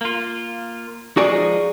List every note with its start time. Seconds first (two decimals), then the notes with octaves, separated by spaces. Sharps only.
0.01 A#3 F4
1.17 F3 G#3 D#4 F#4 G#4 D5